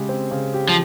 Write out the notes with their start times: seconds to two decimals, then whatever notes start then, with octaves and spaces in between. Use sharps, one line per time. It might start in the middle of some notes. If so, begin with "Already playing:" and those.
Already playing: C#3 G#3 G4
0.09 C4
0.31 C#3
0.54 G4
0.69 F3